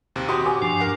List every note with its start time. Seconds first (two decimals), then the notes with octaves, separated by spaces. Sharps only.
0.16 D#2 C3
0.28 F#4 G4 C6 D#6
0.46 G#5 D6
0.62 G2 F3 D4
0.80 A#4 F#5